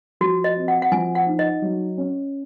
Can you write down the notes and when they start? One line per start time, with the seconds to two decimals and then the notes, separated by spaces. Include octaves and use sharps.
0.21 F3 F#4
0.44 D#5
0.56 C4
0.68 F#5
0.82 F#5
0.91 F3 G#5
1.15 F#5
1.27 D#4
1.39 D#5
1.62 F#3
1.98 C#4